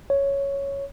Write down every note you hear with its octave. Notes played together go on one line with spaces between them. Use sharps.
C#5